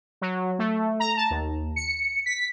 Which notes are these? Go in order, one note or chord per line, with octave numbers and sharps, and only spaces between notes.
F#3
A3
A#5
A5
D#2
C#7
B6